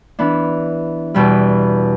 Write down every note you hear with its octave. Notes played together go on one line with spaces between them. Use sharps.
E3 B3 D4
E2 B2 G3